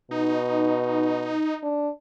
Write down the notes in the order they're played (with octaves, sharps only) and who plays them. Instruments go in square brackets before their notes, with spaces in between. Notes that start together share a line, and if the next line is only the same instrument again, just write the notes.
[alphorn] B2 [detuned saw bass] D#4
[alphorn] D4